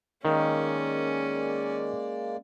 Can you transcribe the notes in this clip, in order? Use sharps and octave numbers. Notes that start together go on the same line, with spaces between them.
D#3 G#3 A#3 C#4 D5